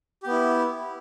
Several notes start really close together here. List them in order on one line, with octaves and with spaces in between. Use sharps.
G4 B3 E4